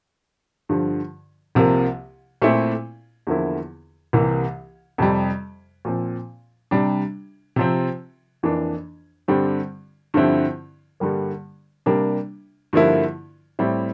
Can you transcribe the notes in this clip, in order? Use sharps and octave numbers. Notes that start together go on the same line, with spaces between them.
G2 D3 F3
C2 C3 F3 A#3
A#2 A3 C4 E4
E2 D3 F3 A#3 E4
C2 C3 E3 A#3
F2 C3 G3
A#2 F3 C4
C3 G3 D4
C3 F3 C4
F2 E3 A#3 D4
G2 D3 G3 C4
G2 D3 F3 C4 E4
G2 D3 G3 A#3
C3 G3 A#3 D4
G2 D3 F3 A#3 E4
A2 G3 C4 E4